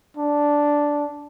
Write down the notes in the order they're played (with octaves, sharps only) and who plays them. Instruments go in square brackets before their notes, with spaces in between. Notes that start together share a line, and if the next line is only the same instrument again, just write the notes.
[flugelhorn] D4